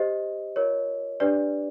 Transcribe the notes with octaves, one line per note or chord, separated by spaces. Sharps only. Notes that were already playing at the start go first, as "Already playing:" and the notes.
Already playing: G4 C5 D#5
F4 A#4 C#5
D4 G4 B4 D5